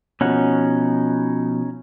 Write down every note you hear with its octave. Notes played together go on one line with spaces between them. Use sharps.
B2 F3 C#4 D#4 F#5